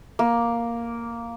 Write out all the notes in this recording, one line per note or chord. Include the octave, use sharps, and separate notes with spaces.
A#3